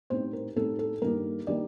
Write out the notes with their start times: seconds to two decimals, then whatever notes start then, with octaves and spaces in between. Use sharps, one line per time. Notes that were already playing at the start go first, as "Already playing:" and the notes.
0.10 A2 G3 C4 D#4 C5
0.33 A#4
0.56 A2 G3 C4 D#4 A4
0.79 A4
1.02 G2 D#3 G3 A#3 D#4 A#4
1.47 D#3 G3 A#3 D#4 D5